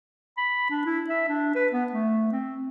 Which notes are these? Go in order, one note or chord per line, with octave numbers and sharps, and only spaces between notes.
B5
D4
E4
E5
D4
B4
B3
A3
C4